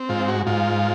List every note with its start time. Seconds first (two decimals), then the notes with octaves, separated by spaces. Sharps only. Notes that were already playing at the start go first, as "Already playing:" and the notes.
Already playing: C4
0.09 G#2 F4
0.28 F#4
0.47 G#2 F4